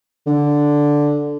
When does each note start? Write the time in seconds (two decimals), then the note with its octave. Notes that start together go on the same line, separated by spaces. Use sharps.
0.27 D3